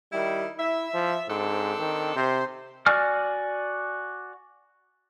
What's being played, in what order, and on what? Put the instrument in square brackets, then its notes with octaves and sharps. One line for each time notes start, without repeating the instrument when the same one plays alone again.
[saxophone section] D#3 E4 [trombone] G3
[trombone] E4 [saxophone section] E5
[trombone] F3
[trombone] G#2 [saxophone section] C4 D4 A4
[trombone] D#3
[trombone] C3 [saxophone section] C5
[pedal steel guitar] F#4 D5 G#5 F6